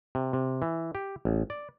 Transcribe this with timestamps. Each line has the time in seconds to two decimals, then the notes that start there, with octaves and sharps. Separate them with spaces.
0.15 C3
0.33 C3
0.62 E3
0.95 G4
1.25 A1
1.50 D5